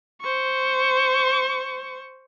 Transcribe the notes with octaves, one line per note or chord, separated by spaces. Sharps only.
C5 C#6